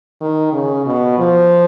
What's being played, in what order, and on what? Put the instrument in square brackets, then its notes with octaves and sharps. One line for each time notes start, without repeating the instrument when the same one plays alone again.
[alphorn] D#3
C#3
B2
F3